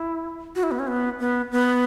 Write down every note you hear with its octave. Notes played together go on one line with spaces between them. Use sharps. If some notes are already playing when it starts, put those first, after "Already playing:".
Already playing: E4
F#4
E4
B3
C#4
B3
B3
B3